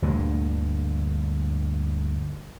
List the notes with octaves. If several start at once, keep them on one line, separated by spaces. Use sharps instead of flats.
D2 G2 A#2 D3